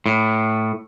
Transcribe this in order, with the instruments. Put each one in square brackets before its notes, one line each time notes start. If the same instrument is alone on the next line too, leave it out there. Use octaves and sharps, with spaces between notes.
[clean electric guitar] A2